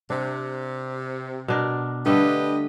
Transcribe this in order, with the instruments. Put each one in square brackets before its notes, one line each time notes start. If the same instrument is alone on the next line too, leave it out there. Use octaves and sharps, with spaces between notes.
[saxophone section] C3 [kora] D4
[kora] B2 D4 A#4
[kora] D3 G3 A3 [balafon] D4 [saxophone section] G4 B4 D#5